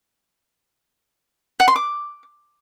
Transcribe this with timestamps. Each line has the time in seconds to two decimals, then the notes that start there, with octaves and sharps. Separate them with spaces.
1.60 F#5
1.68 C6
1.76 D6